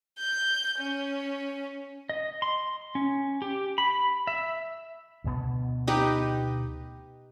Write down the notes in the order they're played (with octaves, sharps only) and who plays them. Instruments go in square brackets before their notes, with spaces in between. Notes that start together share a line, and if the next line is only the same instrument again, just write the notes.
[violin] G6
C#4
[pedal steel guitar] D#5
C6
C#4
G4
B5
E5
[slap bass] D2 B2 B3
[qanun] D#4 G4 B4